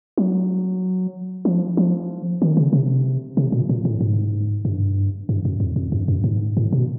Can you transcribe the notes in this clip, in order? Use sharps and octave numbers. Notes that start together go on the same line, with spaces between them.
F#3
F3
F3
D#3
C#3
C3
C3
A#2
A#2
A2
G#2
G2
G2
F#2
F2
F2
G2
F#2
G#2
A2
B2